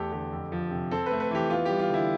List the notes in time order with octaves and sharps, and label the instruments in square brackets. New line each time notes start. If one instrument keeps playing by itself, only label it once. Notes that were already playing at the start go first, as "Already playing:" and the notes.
Already playing: [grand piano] E2 A3 G4 A4
D3 G4
F2
F3
C3
C4 A4
B4
A3
B4
E3 G4
B3 F4
G3 G4
F4
D3 E4